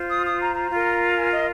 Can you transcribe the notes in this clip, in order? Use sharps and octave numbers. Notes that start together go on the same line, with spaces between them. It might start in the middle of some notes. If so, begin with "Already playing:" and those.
Already playing: F4 C5
D#6
D#6
A#5
A#5
F4 A#4
G#5
D#5